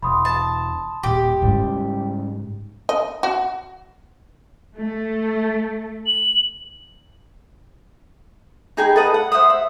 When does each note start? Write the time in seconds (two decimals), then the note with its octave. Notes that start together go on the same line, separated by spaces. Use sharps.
0.02 E1 B5 C6 D#6
0.25 A5
1.03 D#1 A#2 G4
1.42 G#2 C#3 G3
2.89 D#5
3.23 F#4
4.76 A3
6.06 F#7
8.77 D#4 G#4 G5 B5
8.96 A4 B4 D#5 F#5
9.14 F#5
9.32 C5 E5 F#5 D#6
9.50 E5